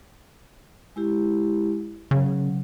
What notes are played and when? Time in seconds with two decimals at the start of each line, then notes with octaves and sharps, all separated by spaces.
0.96 G#3 E4 G4
2.11 C#3 F#3